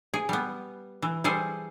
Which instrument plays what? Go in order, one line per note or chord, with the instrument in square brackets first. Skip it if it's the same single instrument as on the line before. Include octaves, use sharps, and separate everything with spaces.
[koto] G#4
G3 B3
E3
G3 G#4 A4 C5